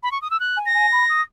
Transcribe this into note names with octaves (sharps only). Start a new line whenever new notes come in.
B5
C#6
D#6
E6
F#6
G#5
A#6
G#5
B5
D#6